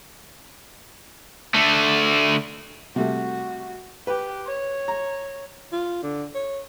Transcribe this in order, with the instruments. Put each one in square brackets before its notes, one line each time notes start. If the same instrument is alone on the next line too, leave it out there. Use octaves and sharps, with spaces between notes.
[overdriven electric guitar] D3 A3
[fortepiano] C3 G3 A3 [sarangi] F#4
[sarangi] G4 [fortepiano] B4
[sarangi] C#5
[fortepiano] A#5
[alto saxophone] F4
D3
C#5